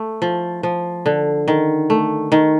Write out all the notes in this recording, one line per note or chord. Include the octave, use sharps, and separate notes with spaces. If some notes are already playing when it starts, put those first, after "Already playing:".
Already playing: A3
F3
F3
D3
D#3
A3
D#3